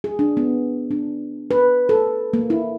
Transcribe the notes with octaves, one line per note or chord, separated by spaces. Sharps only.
G#4
D4
B3
D4
B4
A4
A#3
E4